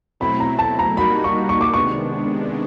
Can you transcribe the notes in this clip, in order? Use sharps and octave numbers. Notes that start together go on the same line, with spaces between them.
B2 F#3 A3 C4 E4 B5
A#5
A5
A#5
G3 A#3 D#4 F#4 B5
C#6
C#6
D6
C3 D#3 G#3 B3 D4 C#6